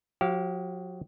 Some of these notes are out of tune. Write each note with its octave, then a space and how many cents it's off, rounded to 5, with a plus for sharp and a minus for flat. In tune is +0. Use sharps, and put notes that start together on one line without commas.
F#3 -45 G4 -30 F5 +0